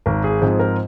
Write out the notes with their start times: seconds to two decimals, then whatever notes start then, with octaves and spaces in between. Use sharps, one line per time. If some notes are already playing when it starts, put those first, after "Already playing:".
0.06 G#1 A#4
0.24 G#4
0.41 G#2 F3 C4 G#4
0.60 A#4